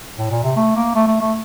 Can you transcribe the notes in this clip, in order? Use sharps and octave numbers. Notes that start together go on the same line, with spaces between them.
A2
A#2
C3
A3
A#3
A3
A3
A3